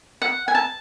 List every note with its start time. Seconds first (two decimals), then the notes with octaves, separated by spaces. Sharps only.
0.22 F#5
0.48 G#5
0.55 A5